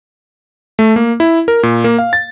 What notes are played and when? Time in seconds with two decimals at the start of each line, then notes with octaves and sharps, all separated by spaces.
0.79 A3
0.96 A#3
1.20 E4
1.48 A#4
1.63 A#2
1.84 A#3
1.99 F5
2.13 A6